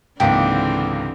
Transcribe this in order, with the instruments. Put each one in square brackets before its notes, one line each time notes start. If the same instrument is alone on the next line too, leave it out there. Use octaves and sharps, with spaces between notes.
[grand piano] C#2 G#2 A#3 [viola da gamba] D3 E3 C4 [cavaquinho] G4